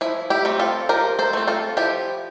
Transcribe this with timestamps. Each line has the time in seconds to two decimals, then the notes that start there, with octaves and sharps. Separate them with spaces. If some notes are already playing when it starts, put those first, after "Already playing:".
0.01 F3 E4
0.30 E4 G4
0.45 A3 C4
0.59 F4 A4
0.89 F3 G4 A#4
1.19 A4 C5
1.33 A3 C4
1.47 F4 A4
1.77 F3 E4 G4